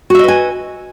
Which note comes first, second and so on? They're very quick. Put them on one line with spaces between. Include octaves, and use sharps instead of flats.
F#4 E5 D#5 B4 G#5